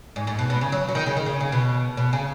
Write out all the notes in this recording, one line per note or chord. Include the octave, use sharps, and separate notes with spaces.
G#2
G#2
B2
B2
C#3
F#3
F#3
D#3
C#3
D#3
C#3
C#3
B2
B2
C#3